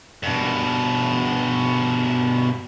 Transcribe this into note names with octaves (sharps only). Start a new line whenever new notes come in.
G2 B2